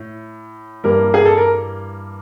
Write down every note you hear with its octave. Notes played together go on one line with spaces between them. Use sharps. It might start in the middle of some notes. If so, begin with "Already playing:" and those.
Already playing: A2
G2 E3 G3 A#3 A#4
G#4
A4
A#4